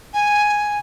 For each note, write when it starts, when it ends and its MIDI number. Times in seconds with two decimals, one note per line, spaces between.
0.13 0.78 80